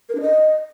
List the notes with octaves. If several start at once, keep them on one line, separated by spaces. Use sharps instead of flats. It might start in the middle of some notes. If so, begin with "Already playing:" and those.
A#4
D4
D#5